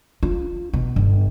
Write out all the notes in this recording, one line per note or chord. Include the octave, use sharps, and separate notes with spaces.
F4
B2
G1